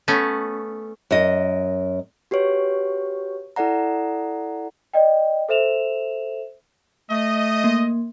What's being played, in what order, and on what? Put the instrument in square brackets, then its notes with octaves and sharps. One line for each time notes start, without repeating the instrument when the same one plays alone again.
[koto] A3 B3 C#4
[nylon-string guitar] F#2 D#5
[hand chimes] F#4 G4 B4 C#5
E4 A4 D5 F#5 A#5
[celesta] D5 D#5 G5
A4 C5 E5 E7 F7
[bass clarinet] A3 [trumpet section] D#5
[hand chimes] A#3